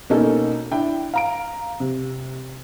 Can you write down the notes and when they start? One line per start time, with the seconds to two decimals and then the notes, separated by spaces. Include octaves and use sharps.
0.10 B2 A#3 C#4 D#4 A4
0.71 D4 E4 G5
1.14 F5 A#5 D7
1.80 C3